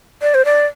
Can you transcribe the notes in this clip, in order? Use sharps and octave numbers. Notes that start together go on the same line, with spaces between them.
D5
C5
D5